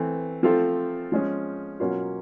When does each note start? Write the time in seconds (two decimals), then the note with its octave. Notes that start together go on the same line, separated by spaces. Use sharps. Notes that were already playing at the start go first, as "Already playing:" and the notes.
Already playing: E3 A3 C4
0.43 F3 A3 C4 F4 A4
1.12 F3 G#3 C#4
1.80 B2 F#3 A#3 C#4 F4